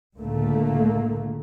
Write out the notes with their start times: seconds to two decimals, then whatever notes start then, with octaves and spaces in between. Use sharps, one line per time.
0.18 C#2 A2 D3 A3 A#3